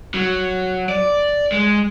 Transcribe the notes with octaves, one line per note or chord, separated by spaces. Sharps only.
F#3
D5
G#3